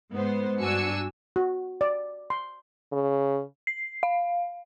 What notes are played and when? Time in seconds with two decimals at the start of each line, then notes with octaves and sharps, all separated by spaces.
0.12 G#2 B3 C5
0.59 G2 D4 F#4 G#5 E6 C#7
1.36 F#4
1.81 D5
2.30 C6
2.92 C#3
3.67 C7
4.03 F5